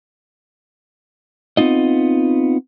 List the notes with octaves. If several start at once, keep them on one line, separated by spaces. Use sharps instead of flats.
B3 C4 D#4 F4 D#5